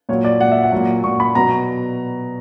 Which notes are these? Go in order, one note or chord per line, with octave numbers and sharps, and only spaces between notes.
A#2 F#3 C#5
D5
A#2 F#3 F#5
E5
F#5
A#2 F#3
A#2 F#3 C#6
B5
B2 F#3 A#5